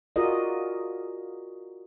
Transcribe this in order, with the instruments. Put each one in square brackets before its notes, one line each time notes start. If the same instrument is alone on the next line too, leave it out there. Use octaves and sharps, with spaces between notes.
[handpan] F4 F#4 G#4 A#4 D5 D#5